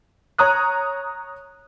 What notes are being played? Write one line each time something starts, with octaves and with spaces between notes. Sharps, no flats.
C#5 A#5 D#6 F#6